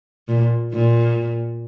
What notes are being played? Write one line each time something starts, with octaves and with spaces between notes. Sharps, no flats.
A#2
A#2